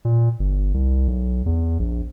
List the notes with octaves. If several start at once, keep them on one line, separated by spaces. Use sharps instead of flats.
A#2
G1
C2
B1
E2
A#1